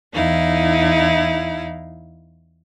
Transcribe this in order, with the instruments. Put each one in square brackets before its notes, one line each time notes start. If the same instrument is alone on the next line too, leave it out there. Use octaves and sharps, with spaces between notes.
[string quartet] E2 D#4 E4 F5